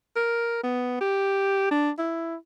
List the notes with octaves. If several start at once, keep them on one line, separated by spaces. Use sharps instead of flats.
A#4
B3
G4
D4
E4